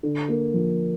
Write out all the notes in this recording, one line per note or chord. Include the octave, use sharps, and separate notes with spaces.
D3
A#3
F3